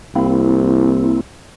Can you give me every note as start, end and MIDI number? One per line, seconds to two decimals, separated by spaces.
0.16 1.15 36
0.16 1.21 58
0.16 1.21 60
0.16 1.21 64